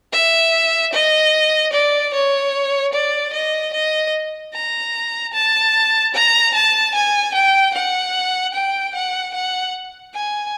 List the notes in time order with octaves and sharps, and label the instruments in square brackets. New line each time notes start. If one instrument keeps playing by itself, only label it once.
[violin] E5
D#5
D5
C#5
D5
D#5
D#5
A#5
A5
A#5
A5
G#5
G5
F#5
G5
F#5
F#5
G#5